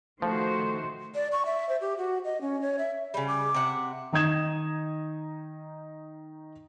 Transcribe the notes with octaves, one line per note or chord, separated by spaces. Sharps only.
D#3 F3 A3 F#4 C5
D5
C#6
E5
C5
G4
F#4
D#5
C#4
C#5
E5
C#3 G3 B5
D6
C3 E5 F#5
D#3 D#4 D#6 G#6 E7